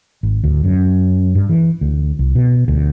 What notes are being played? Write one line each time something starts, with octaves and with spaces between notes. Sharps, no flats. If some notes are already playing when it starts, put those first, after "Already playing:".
G#1
D2
F#2
G2
E3
D2
C2
B2
D2